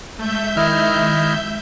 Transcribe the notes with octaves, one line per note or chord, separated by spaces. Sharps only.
G#3 A3 E5 G6
D#3 E4 D#5 F6